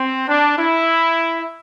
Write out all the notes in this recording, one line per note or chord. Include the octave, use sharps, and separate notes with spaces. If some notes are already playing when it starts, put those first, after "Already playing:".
Already playing: C4
D4
E4